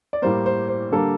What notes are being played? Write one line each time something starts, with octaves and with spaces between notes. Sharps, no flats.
D5
A2 G3 A#3 C5
C5
C5
D3 G3 A#3 A4